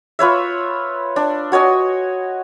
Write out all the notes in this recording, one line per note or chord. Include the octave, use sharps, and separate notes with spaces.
F4 B4 C#5 E5
D4
F#4 C#5 D#5 G#5